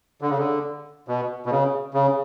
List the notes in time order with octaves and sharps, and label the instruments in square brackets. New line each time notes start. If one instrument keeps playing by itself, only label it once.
[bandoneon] D3
C#3
D3
B2
B2
C#3
C#3